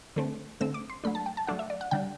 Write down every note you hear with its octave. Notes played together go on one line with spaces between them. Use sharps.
D3 A3 C4
D3 A3 C4 E6
D6
C6
F#3 A3 D4 B5
A5
G5
A5
F#3 A3 D4 F#5
E5
D5
F#5
D3 G3 D4 G5